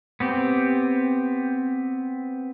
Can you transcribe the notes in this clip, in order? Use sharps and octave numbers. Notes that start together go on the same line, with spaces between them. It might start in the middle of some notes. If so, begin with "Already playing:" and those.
B3 C4 G4